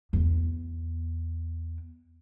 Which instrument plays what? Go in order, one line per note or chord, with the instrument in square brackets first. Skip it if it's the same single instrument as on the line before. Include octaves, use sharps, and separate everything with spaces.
[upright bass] E2 B3